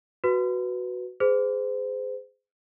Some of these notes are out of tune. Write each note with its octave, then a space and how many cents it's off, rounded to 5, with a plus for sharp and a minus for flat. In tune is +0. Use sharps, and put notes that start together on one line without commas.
F#4 +0 B4 +0
G#4 +0 C5 -35